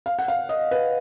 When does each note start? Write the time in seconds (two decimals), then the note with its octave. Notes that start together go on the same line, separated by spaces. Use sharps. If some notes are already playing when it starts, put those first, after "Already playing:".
0.06 F5
0.19 F#5
0.28 F5
0.49 D#5
0.71 B4